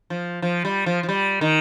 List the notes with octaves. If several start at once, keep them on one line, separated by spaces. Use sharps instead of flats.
F3
F3
G3
F3
F3
G3
D#3